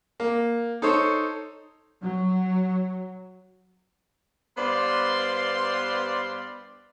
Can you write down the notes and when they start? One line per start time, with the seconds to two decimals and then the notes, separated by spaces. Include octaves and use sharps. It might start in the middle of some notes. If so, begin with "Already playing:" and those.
0.20 A#3
0.82 D#4 A4 C5 C#5
2.02 F#3
4.56 G2 B3 C5 D5 F5 C6